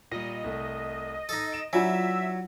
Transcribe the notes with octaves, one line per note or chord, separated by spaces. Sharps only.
A#2 G3 D#5
C2 A3
D#4 A4
D7 E7
F#3 D4 E4 F4 D5 E5 G#5 A#5